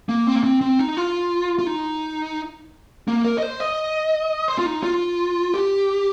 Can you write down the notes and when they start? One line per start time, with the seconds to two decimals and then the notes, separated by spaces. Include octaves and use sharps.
0.09 A#3
0.27 C4
0.35 A#3
0.43 C4
0.61 C4
0.79 D#4
0.97 F4
1.59 F4
1.67 D#4
3.08 A#3
3.25 A#4
3.38 D#5
3.43 C5
3.60 D#5
4.48 C5
4.58 F4
4.66 D#4
4.83 F4
5.54 G4